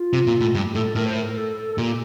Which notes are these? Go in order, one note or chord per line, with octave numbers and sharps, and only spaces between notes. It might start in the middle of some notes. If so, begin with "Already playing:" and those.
Already playing: F4
C3
A#2
A2
G2 G4
A2 A4
A2 A#4
C5
A#4
A4
A4
A4
A#2 G4